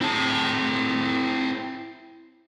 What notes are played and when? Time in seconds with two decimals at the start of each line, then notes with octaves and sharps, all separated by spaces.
0.01 C4 E4 G#4 A5